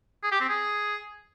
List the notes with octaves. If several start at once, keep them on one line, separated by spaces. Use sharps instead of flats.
G#4
G4
C4
G#4